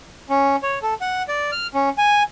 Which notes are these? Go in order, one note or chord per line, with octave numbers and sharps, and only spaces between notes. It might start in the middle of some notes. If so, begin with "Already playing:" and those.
C#4
C#5
A4
F#5
D5
F6
C#4
G#5